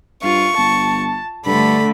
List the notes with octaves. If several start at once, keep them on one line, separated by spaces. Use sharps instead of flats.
G2 F4 C#6
G1 A5
G2 D3 A3 A4 B5